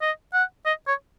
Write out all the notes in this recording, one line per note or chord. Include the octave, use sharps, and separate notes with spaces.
D#5
F#5
D#5
C#5